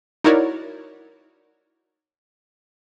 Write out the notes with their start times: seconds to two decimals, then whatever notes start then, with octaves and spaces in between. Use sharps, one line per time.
0.24 D#4 E4 F#4 A#4 C#5 D5